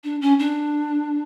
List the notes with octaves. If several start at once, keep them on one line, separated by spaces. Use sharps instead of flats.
D4
C#4
D4